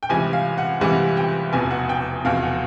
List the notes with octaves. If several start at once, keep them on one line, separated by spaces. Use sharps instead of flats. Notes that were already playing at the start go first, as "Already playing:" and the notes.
G5
C#2 C3 E3 G3 G#5
F5
F#5
C#2 C3 E3 G3 F#5
G5
F1 E2 B2 G#5
F#5
G5
F1 E2 B2 F5
F#5